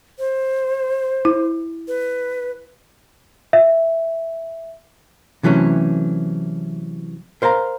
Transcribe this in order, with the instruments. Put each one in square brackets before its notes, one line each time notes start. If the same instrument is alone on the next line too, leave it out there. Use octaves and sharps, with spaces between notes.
[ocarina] C5
[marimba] E4
[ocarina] B4
[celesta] E5
[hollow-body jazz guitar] C3 E3 F#3 A3 C#4
A#4 C5 F5 F#5 A#5